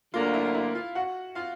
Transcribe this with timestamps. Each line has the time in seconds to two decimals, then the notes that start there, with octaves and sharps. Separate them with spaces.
0.14 D2 D3 F#3 A#3 F4 F5
0.34 E4 E5
0.45 F5
0.55 E4 E5
0.75 F4 F5
0.95 F#4 F#5
1.35 F4 F5